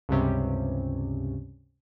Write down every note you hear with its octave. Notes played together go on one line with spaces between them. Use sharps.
C#2 G2 C3 C#4